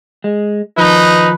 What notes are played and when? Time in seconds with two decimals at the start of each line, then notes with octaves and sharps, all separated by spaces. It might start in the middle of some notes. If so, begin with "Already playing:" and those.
0.24 G#3
0.78 D#3 F3 D#4 B4